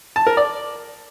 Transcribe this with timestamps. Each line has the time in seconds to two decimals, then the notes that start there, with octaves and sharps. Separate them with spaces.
0.16 A5
0.27 A#4
0.37 D5